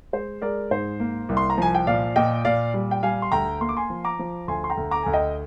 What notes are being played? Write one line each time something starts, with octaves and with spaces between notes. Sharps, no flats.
G#3 C5
G#3 A#4 D5
G#2 C5
A#3
C2
C6
A#5
F3 G#5
G5
A#2 D5 F5
A#2 D#5 G5
A#2 D5 F5
G3
G5
G3 F5 G#5
C6
D2 G5 A#5
A#3 C6
D6
G#5 C6
F3
A#5 D6
F3
D2 G#5 C6
C6
G5 A#5
D2
A#5 D6
D2 G#5
D#5 G5